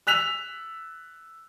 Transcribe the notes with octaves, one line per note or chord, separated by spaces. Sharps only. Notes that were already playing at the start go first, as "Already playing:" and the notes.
E6 F#6 B6 F7